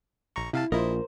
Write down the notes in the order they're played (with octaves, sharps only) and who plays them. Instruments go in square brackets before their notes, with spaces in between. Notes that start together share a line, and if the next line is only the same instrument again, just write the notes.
[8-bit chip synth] A#1 A#5 C#6
[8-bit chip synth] C3 F5 A5 [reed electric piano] E4
[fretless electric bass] A#1 [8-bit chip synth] E4 D#5 [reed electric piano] F4 [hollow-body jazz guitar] A#4 C5